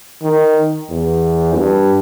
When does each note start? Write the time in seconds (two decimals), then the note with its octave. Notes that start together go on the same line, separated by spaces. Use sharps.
0.23 D#3
0.90 E2
1.56 G2